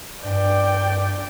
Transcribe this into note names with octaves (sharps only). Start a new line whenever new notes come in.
G2 D5 G5